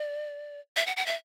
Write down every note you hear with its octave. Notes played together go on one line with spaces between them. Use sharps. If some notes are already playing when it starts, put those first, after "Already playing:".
Already playing: D5
E5
F#5
F#5
E5